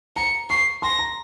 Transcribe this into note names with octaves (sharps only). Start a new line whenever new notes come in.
A#5 C#7
C#6 C7
C6 A#6
A#5